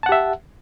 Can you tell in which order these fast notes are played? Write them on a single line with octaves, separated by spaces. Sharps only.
A5 F#5 G4 E5